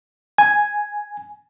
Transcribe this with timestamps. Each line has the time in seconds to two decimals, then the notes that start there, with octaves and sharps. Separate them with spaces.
0.38 G#5